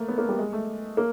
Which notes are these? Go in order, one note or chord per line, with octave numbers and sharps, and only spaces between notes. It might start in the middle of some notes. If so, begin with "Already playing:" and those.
Already playing: A3 A#3
B3
A#3
G3
G#3
A3
A#3